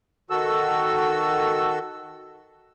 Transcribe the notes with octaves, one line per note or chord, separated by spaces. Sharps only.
D#3 F#4 A4 E6